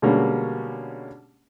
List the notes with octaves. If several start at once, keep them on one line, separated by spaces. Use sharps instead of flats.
B2 D3 G3 G#3 A#3 C#4